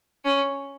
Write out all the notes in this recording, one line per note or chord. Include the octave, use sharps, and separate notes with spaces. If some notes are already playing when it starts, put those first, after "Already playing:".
C#4